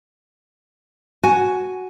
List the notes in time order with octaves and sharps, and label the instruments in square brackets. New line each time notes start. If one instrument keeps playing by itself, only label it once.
[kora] F#4 [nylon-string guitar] G#5